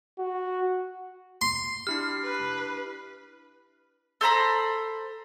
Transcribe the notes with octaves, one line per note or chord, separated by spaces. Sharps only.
F#4
C6
D4 E4 G4 F6 C7
B4
A4 C5 A#5 B5